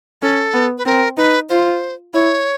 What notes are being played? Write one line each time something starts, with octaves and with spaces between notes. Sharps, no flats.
C#4 A4
B3
B4
C4 A#4
D#4 B4
F4 C5
E4 C#5